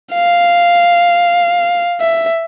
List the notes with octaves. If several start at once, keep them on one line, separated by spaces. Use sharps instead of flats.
F5
E5